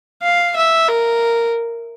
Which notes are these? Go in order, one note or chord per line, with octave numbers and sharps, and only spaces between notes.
F5
E5
A#4